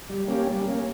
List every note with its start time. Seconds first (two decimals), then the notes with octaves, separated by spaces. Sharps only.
0.10 G3
0.28 A#3 C#4 G4
0.47 G3
0.64 A#3 C#4